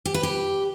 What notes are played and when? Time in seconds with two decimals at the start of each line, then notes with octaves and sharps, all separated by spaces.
0.05 G4
0.14 B4
0.23 G4